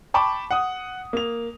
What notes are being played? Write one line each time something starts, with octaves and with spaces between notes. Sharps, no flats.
G5 A5 B5 C#6 D6
F#5 D#6
A#3 F7